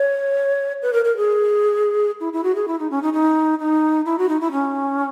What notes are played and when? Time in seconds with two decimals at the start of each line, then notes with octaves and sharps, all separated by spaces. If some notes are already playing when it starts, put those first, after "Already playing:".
Already playing: C#5
0.82 B4
0.93 A#4
1.05 A#4
1.17 G#4
2.20 E4
2.33 E4
2.44 F#4
2.55 G#4
2.68 E4
2.79 D#4
2.91 C#4
3.03 D#4
3.13 D#4
3.59 D#4
4.06 E4
4.18 F#4
4.29 D#4
4.41 E4
4.52 C#4